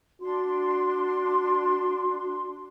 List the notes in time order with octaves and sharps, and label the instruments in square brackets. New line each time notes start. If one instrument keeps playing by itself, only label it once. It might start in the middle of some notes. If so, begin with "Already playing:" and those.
[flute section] D4 C6 [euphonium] F#4